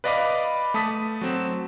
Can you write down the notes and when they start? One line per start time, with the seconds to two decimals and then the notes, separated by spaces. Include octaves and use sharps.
0.04 B4 D5 D#5 F5 B5 D6
0.74 A3 A5 D#6 B6
1.21 F#3 C4 E7